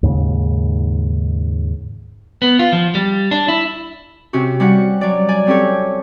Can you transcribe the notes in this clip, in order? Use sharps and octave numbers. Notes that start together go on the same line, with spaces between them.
D#2 G#2 C#3
B3
F4
F3
G3
D4
E4
C3 C4 C#4 F#4
G3 C#4 F#4 F#5
F#3 D5
D5 G#5
C4 C#4 G4 A4 C#5